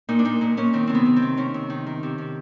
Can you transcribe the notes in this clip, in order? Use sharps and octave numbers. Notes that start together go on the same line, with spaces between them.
A#2 D#4
D4
A#2 D#4
A#2
A#2 C#4
D#3 C4
C3 C4
B3
C3
C4
D#3
D#3 C#4
C3
D#3
D#3
C3
C3